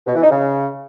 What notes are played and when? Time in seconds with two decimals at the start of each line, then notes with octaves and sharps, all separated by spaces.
0.07 B2
0.15 E3
0.23 D#4
0.30 C#3